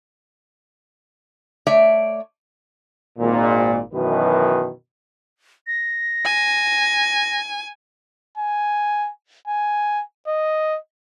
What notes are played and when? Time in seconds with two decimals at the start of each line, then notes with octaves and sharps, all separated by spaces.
1.67 A3 C#5 D5 E5
3.19 G#1 A#2
3.93 F#2 B2 D#3 E3 B4
5.67 A#6
6.25 G#5
8.38 G#5
9.48 G#5
10.28 D#5